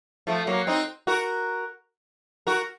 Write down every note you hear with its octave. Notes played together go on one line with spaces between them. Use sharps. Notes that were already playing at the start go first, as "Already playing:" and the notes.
F3 A3
F#3 A#3
C4 D#4
F#4 A#4
F#4 A#4